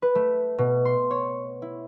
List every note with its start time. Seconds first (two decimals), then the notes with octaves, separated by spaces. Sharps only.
0.02 B4
0.15 A3
0.58 B2
0.85 C6
1.11 C#5
1.62 E4